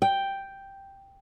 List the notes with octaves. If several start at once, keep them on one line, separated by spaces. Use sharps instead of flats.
G5